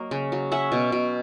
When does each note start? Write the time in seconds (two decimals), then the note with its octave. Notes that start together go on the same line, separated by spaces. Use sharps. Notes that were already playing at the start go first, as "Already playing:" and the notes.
Already playing: F#3 A#3 D#5
0.11 C#3
0.32 F#3
0.52 C#4 E5 F#5
0.72 B2
0.92 B2